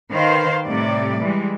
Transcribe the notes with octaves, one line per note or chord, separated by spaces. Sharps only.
D#3 B4 C5 F5
A2 C3 G3 D5
E3 G3 G#3